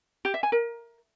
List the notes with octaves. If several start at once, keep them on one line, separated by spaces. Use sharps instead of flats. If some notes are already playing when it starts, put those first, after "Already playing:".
G4
E5
G#5
A#4